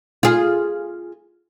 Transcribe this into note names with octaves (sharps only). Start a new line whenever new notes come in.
F4 G#4